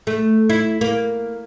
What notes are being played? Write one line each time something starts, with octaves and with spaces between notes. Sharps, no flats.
A3
E4
A#3